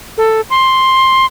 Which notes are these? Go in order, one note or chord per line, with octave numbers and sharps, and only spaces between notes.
A4
C6